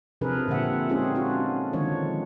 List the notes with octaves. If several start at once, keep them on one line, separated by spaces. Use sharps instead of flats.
C3 F3 D4 G#4 A#4 B4
A#2 D3 C4 E5 F#5
G#3 C4 C#4 D#4 F4 G#4
C#4 D4 F4 F#4
D3 D#3 F3 G#3 D4 C#5